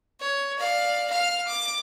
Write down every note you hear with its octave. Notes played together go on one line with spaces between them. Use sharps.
C#5
D5 F5
F5 F6
D6